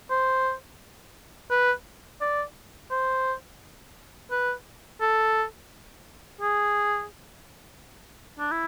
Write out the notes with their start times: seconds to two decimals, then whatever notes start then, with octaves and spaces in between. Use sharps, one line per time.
0.10 C5
1.51 B4
2.21 D5
2.91 C5
4.31 B4
5.01 A4
6.41 G#4
8.39 D4
8.52 E4